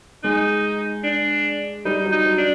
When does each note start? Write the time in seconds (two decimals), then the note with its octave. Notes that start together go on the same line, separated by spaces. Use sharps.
0.24 G#3 D#4
1.04 D4
1.85 G3 D#4
2.05 F#3
2.12 D#4
2.26 F#3
2.38 D4